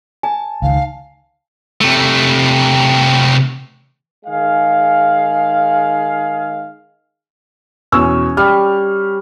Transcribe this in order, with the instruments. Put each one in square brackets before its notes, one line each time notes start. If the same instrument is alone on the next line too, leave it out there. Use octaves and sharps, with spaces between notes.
[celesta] G#5 [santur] A5
[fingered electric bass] C#2 D#3 [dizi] F5
[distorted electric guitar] C3 A3
[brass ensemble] D#3 G#3 G#4 F5
[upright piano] E2 B2 E6 [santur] C#4
[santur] G3 [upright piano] F6